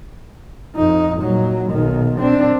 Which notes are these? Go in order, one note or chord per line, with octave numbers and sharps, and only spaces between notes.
F2 D#4
A#2 F#3
B1 D#3
C4 D4